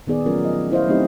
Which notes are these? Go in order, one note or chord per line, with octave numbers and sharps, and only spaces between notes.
A#2 D#3 B3 G#4 D5
F3 F#3 A3 C#4 A#4
F#3 D#5
E4 C5 D#5 F5
F#3 A3 C4 D#4 G4 D#5